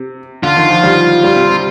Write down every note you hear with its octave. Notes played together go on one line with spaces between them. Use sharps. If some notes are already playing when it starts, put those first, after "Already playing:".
Already playing: C3
D3 F4
D#3
F3
G3
G3
C3
C3